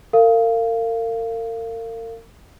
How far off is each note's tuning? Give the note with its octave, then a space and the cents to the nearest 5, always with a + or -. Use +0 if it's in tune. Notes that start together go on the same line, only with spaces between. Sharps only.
A#4 -40 F5 -15